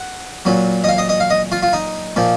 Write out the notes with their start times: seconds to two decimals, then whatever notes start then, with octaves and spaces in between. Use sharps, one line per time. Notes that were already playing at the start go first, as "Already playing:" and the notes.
Already playing: F#5
0.45 A#2 F#3
0.84 D#5
0.88 F5
0.98 D#5
1.09 D#5
1.20 F5
1.30 D#5
1.52 F4
1.62 F4
1.73 D#4
2.16 A#2 F3